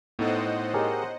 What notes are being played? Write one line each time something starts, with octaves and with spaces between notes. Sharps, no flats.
A2 B3 D#4 A4 C5 D#5 F#5
G4 G#4 A#4 C#5